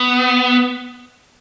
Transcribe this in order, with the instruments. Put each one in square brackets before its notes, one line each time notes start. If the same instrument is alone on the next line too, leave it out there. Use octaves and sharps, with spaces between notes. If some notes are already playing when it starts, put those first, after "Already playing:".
Already playing: [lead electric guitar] B3